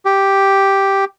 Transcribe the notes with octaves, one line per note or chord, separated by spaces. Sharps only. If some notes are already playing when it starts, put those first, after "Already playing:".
G4